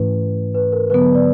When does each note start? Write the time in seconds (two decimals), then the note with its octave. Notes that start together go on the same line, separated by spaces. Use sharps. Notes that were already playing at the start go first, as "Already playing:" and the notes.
Already playing: G#2 E3 A3 C#4 E4 B4
0.54 B4
0.72 A#4
0.90 D3 F#3 B3 B4
1.15 D5